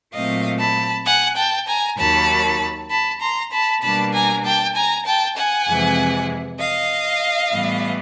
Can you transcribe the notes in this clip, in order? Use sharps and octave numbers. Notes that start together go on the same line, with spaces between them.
A#2 F#3 A3 C4 D#5 F5
A5 B5
F#5 G#5
G5 A5
G#5 A#5
D#2 D#3 F#3 A5 B5
A5 B5
A#5 C6
A5 B5
B2 G3 A#3 D4 A5 B5
G#5 A#5
G5 A5
G#5 A#5
G5 A5
F#5 G#5
F2 C3 E3 G#3
D#5 F5
A2 E3 G3 B3